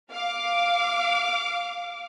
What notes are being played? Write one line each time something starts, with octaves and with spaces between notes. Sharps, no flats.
F5 D6